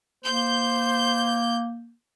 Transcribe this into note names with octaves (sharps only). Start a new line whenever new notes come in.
A#3 C5 G6